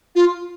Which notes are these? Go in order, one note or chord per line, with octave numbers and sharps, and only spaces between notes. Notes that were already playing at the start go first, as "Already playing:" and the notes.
F4